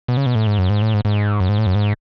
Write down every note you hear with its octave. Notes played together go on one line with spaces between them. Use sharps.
B2
C#3
B2
A2
G#2
F#2
G#2
A2
G#2
G#2
F#2
G#2
A2
F#2
G#2